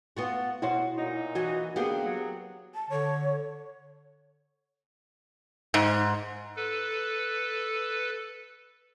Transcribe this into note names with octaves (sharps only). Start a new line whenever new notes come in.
B3 F4 F#4
B2 E4 F#4 C5 C#5
A#2 D#4
E3 F#3 F#4
D3 A#3 B3 G4 G#4
F#3
A5
D3 C#5
G#2
A4 B4